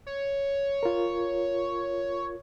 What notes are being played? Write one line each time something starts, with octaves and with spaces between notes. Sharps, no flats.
C#5
F4 A#4